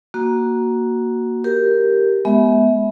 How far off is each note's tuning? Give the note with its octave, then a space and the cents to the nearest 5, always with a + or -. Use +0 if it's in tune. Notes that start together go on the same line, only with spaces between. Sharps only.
A#3 +10 F#4 +0
G4 +0 A#4 +0
G#3 +25 B3 +0 E5 -25